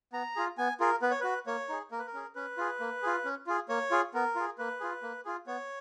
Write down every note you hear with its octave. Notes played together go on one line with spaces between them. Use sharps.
B3 A#5
F4 G#4
B3 G#5
F4 G#4 A#4
B3 B4
C#5
F#4 B4
A#3 C#5
D#4 G#4
A#3 A#4
B4
A#4
C#4 G#4
C#4 B4
F4 G#4
A#3
F4 G#4
C#4
F4 G#4
A#3 C#5
F4 G#4
B3 A#4
F4 G#4
A#3 B4
F4 G#4
A#3
F4 G#4
B3 C#5